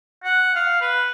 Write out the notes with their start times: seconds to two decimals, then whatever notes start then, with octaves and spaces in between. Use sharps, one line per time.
0.24 F#5
0.55 F5
0.81 B4